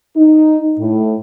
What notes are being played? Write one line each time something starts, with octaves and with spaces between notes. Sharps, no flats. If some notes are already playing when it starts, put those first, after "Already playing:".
D#4
A2